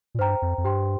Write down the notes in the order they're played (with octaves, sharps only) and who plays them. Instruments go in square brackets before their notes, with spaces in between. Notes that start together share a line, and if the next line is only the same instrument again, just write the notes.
[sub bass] A#2
[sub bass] G2 [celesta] C5 G5 A#5
[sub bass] F2
F2
[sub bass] G2 [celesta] G4 C5 G5 C6